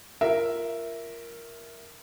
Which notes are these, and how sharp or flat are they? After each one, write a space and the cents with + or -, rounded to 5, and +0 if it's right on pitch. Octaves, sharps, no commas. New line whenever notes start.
F4 -20 A#4 +0 E5 +0